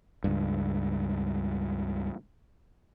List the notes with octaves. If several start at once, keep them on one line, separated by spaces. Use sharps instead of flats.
C#2 G2